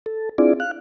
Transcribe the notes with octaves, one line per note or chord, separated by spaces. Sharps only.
A4
C4 D4 E4 F4 G#4 D5
F5 F#6